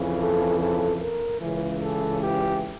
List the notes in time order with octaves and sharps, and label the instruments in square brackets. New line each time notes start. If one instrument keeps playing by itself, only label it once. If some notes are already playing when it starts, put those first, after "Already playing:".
Already playing: [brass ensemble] F2 C#3 E3
A4
A4
A#4
C#2 C#3 E3
A4
G4